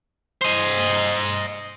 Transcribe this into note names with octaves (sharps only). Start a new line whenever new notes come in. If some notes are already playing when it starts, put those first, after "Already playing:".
C5 D#5